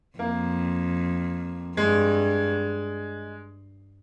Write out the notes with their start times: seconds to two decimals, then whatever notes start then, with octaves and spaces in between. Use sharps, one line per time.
0.18 F2 A#3
1.77 G2 G#3